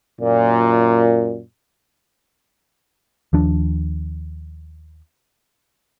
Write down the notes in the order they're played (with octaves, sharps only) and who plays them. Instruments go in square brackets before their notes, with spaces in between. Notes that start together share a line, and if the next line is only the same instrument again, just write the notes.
[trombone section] F#2 A#2
[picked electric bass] D#2 F3 D4